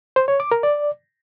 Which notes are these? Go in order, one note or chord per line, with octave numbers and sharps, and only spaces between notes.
C5
C#5
D6
A#4
D5